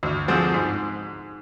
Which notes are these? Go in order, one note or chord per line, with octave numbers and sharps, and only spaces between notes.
D2
D3 F3 G#3 C4
G#2